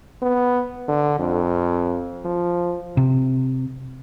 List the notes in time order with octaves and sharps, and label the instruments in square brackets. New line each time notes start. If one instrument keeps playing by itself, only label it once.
[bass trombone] B3
D3
F2
F3
[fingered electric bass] C3